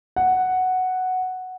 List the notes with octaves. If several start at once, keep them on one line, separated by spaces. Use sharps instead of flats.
F#5